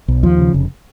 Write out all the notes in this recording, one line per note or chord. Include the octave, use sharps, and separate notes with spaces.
B1
D#2 F3
C#3
F1